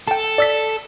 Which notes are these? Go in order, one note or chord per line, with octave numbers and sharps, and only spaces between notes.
A4 G5 A5
D5 E6 B6